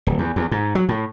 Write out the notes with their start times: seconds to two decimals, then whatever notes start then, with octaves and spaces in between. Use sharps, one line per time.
0.07 D1
0.19 E2
0.36 E2
0.51 G#2
0.75 F#3
0.89 A2